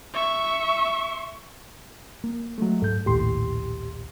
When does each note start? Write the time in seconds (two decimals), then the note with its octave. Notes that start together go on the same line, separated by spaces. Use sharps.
0.14 E5 C#6
2.24 A#3
2.58 F#3 G#3 A3
2.82 G#2 A4 G6
3.06 A#1 D#2 A2 G4 C6